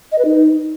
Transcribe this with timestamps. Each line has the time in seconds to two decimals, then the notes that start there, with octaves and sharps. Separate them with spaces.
0.12 D#5
0.18 B4
0.25 D#4